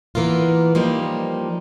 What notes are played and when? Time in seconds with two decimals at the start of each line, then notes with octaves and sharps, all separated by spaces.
0.15 E3 A#3 B3 F4
0.75 F3 G3 A#3 D#4